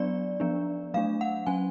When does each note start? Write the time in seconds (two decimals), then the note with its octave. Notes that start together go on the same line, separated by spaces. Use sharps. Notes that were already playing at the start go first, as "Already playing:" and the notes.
Already playing: F#3 B3 D4 D5
0.40 F3 B3 D4
0.94 F#3 A3 D4 F5
1.21 F#5
1.47 F#3 C#4 G#5